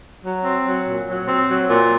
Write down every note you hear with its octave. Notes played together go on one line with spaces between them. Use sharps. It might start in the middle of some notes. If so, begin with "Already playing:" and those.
F#3
C4
F#3
A#2
F#3
C4
F#3
A#2